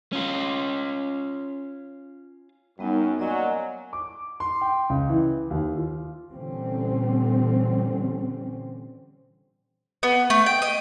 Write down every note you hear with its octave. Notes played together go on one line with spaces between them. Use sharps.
C#4 F4
F#2 G3 B3 D#4
A#2 F#3 D5 D#5 G#5
D6
C6
G5
C#2
E3
D#2
F4
A#2 D3 E3 G3 C4 C#4
B3
A3
G5
D#5